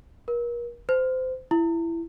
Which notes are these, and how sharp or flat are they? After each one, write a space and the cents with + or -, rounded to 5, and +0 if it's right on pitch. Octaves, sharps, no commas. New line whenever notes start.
A#4 +40
C5 -25
E4 +15